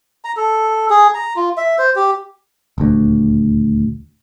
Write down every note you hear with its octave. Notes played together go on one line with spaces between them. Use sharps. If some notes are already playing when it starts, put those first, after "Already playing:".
A#5
A4
G#4
A#5
F4
E5
C5
G4
D#1 D2